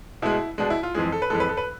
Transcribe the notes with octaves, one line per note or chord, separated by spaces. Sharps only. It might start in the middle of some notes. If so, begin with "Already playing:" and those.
B2 G#3 E4
B2 G#3 D4
E4
F4
F2 E3 G#3 G#4
A4
B4
F2 E3 G#3 A4
B4
A4
B4